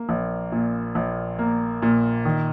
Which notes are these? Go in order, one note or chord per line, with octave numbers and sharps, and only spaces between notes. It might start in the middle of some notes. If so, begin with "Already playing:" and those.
Already playing: A#3
A#1
A#2
A#1
A#3
A#2
D#3